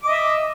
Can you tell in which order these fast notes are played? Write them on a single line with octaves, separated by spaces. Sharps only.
D6 D#5 E5